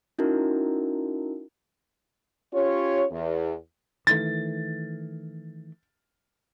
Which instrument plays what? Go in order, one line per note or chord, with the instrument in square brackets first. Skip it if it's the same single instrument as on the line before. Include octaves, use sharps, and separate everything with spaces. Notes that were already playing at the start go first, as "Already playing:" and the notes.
[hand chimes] C#4 D#4 E4 F#4 A#4
[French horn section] C#4 F4 G4 C#5
E2
[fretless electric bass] D#3 E3 A3 [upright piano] A6